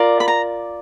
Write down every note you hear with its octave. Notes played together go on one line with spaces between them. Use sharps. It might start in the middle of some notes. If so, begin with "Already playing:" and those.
Already playing: F4 A#4 D5
B5
A#5